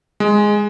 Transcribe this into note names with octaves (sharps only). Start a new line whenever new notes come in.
G#3